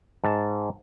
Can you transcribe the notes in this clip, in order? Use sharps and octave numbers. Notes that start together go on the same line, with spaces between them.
G#2 A5